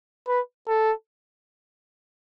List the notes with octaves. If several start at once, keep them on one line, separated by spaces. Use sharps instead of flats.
B4
A4